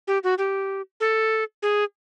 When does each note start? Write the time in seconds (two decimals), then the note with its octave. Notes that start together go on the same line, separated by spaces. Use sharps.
0.07 G4
0.24 F#4
0.38 G4
1.00 A4
1.62 G#4